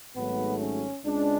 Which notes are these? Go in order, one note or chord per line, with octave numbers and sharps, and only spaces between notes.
G#1 G#2 F#3 A3 B3
C#4
C#2 C#3 G#3 D4